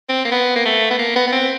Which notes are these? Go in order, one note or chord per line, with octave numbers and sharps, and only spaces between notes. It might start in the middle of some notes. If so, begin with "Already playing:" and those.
C4
A#3
B3
A#3
A3
B3
A#3
B3
B3
C4